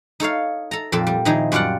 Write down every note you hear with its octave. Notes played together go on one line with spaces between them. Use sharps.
D#4 A4 C#5 F5
A4 A#5
F2 A#2 C4 A4
G3
A#2 D#3 F3 D#4 E4 G#4
F#2 G3 F4 D5 F#5